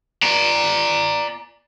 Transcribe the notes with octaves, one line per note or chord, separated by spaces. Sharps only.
D5 A#5